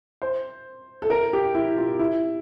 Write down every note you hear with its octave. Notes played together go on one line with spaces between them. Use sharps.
C5
A4
A#4
G4
E4
F4
E4